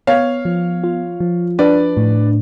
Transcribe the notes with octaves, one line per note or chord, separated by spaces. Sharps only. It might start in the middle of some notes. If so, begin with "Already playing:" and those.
B3 C#5 F5
F3
F4
F3
D4 B4 D5
A2